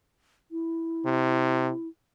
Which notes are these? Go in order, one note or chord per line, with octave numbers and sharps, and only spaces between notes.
E4
C3